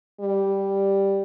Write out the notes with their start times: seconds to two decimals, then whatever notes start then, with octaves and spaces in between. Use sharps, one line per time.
0.21 G3